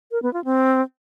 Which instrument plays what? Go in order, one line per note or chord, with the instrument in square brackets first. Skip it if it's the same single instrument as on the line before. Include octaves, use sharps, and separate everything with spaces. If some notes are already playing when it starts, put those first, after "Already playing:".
[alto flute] A#4
B3
F4
C4